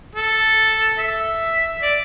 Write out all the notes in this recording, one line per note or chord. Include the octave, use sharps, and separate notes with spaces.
A4
E5
D5